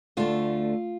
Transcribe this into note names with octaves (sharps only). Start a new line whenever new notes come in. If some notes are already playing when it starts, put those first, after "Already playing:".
D2 D3 A3 F4